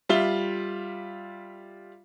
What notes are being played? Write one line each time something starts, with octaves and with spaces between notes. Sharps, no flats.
G3 F4 E5 G7